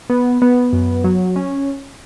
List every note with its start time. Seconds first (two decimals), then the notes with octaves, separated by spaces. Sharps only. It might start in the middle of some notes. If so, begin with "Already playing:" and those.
0.10 B3
0.42 B3
0.73 F#2
1.04 F#3
1.36 C#4